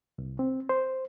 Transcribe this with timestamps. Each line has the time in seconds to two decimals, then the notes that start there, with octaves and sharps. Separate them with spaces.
0.18 C2
0.39 C4
0.69 C5